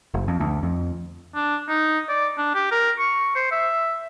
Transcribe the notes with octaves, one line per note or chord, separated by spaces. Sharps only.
F#1
F2
D2
F2
D4
D#4
D5
D4
G4
A#4
C#6
C5
E5